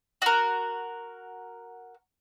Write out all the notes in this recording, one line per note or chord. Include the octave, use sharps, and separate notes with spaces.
F#4 A#4